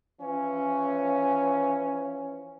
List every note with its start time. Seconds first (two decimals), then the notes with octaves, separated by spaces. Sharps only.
0.21 E3 F3 C#4